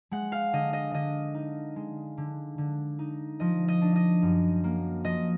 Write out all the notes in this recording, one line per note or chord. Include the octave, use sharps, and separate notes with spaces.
G#3 F#5
F5
D3 D#5
D#5
D3 D#5
D#4
G#3
D3
D3
D#4
F3 D#5
D#5
D4
D#5
F#2
A#3
F3 D#5